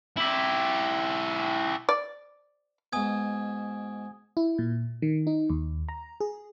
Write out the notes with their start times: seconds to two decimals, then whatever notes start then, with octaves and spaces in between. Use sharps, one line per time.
0.17 E4 G4
1.89 D5
2.93 G#2 B2 G#5 D#6 G#6
4.37 E4
4.58 A#2
5.02 D#3
5.27 D#4
5.50 D#2
5.89 A#5
6.20 G#4